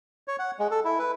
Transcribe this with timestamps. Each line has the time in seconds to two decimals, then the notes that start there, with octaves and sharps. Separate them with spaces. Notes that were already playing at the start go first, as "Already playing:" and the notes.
0.28 C#5
0.39 F#5
0.59 G#3
0.71 A4
0.85 E4
0.99 B4